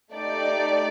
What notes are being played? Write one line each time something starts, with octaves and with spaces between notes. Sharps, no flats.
A3 D#4 G4 D5